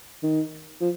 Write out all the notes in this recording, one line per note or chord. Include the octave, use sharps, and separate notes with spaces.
D#3
F3